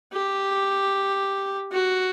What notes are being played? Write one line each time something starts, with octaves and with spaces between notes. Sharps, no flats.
G4
F#4